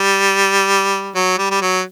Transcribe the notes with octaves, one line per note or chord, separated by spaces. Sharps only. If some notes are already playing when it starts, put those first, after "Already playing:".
Already playing: G3
F#3
G3
G3
F#3